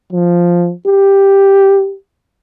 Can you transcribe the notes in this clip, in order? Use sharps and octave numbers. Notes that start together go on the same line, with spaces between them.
F3
G4